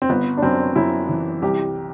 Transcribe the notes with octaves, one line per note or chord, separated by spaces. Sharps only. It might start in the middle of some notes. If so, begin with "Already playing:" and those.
C4
G1 B3
D4
F#2 C4
F#2 E4
E3
C2 G4